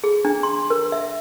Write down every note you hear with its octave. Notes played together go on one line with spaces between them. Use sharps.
G#4
D4
C6
A#4
E5